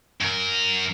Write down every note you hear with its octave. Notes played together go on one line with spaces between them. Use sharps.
F#2 A#4